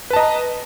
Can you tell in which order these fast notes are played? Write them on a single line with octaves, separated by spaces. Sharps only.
B4 A5 D#5 A#5